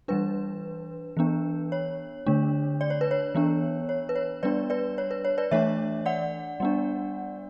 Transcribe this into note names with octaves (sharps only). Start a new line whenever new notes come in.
E3 G3 D4 B4
E3 B3 D4
C#5
D3 A3 D4
D5
C#5
B4
C#5
E3 B3 D4
C#5
B4
C#5
G3 B3 D4 B4 D5
B4 D5
C#5
B4
C#5
B4 D5
E3 A3 D4 C#5 E5
D5 F#5
G3 B3 D4